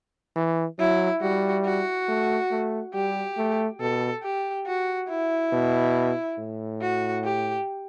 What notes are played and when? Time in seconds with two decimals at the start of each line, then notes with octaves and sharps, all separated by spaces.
0.36 E3
0.79 F#3 E4
1.22 G3 F#4
1.65 F#4
2.08 A3
2.51 A3
2.94 G3 G4
3.38 A3
3.80 B2 A4
4.23 G4
4.66 F#4
5.09 E4
5.52 B2
6.38 A2
6.82 F#4
7.24 G4